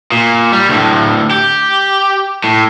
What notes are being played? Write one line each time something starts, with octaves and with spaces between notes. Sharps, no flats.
A#2
G3
D2 A2
G4
A2